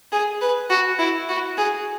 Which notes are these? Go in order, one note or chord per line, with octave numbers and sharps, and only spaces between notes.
G#4
B4
F#4
E4
F#4
G#4